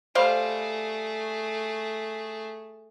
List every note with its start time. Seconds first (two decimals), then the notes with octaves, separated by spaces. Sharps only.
0.15 G3 A3 G#4 C5 F5